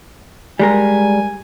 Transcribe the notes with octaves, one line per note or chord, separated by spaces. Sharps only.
G3 G#3 A#4 G#5